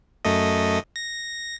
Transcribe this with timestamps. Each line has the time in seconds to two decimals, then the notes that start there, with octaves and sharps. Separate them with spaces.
0.25 F#2 A3 D#5
0.96 A#6